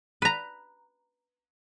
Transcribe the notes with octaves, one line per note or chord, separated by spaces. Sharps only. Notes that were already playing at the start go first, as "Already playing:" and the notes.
B4 A#5